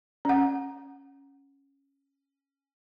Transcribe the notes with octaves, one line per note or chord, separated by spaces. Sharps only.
C#4 F#5